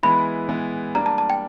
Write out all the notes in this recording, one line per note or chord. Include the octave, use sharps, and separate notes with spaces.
E3 G#3 B3 E4 B5
E3 G#3 B3 E4
G3 A#3 D4 A#5
A5
A5
G5